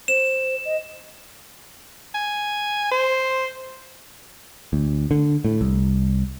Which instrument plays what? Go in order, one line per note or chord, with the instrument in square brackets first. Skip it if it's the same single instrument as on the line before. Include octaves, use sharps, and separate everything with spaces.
[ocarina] C5 [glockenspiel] E7
[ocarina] D#5
[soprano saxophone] G#5
C5
[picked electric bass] D2
D3
A2
C2